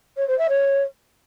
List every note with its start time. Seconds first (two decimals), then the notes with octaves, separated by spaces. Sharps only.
0.16 C#5
0.27 C5
0.38 E5
0.48 C#5